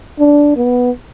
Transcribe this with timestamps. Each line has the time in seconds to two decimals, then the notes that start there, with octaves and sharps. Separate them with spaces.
0.19 D4
0.57 B3